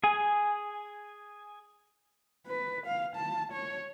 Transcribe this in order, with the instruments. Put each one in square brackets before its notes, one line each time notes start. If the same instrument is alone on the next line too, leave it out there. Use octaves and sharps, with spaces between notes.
[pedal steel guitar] G#4 G#5
[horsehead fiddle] B4
F5
A5
C#5